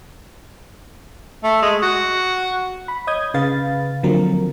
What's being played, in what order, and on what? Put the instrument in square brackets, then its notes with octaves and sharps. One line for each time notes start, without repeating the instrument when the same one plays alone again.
[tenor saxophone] A3
G#3
F#4
[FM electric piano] B5
C#5 D#5 D#6 G6 G#6
C#3 B4 F5 A6
D3 F3 F#3 A#3 C4 A#4